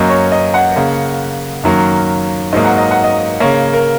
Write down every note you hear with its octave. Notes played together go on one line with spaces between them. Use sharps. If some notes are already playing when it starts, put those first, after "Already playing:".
Already playing: F#2 F#3 A#3 D#5
C#5
D#5
F#5
C#3 A#3
F#2 D#3 F#3 A#3
G#2 F#3 A#3 D#5
F#5
D#5
F#5
D#5
C#3 A#3 C#5
A#4